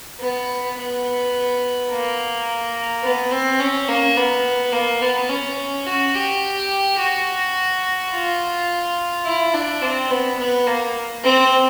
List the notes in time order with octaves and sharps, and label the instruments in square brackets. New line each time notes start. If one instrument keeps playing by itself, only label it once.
[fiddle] B3
B3
A#3
B3
C4
C#4
A#3
B3
A#3
B3
C#4
F#4
G4
F#4
F4
E4
D4
C4
B3
B3
A#3
C4